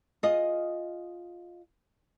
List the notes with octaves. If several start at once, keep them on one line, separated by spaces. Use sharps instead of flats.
F4 G#4 D#5